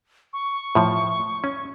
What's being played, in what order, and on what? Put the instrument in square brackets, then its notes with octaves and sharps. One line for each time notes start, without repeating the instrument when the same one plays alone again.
[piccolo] C#6
[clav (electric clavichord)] A2 F3
C#4